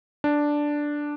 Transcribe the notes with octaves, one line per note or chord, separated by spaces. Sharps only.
D4